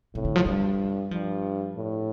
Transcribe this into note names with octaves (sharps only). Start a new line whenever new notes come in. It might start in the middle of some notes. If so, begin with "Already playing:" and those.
A2 C3
D3
F3
G2 G3
G2 F3
A2